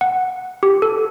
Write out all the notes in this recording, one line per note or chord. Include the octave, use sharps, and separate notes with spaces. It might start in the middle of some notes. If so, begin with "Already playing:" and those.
F#5
G4
A4